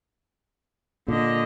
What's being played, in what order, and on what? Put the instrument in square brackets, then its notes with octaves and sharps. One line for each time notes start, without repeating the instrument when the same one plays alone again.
[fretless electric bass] A#2 [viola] D3 D#5